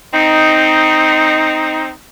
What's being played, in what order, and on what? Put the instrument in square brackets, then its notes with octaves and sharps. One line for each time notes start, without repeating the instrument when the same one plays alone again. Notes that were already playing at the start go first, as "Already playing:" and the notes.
[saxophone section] C4 D#4